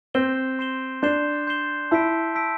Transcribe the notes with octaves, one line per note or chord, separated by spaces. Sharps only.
C4 C6 G6 C7 E7 G7
C6 G6 C7 E7 G7
D4 C6 G6 C7 E7 G7
C6 G6 C7 E7 G7
E4 A5 E6 B6 D7
A5 E6 B6 D7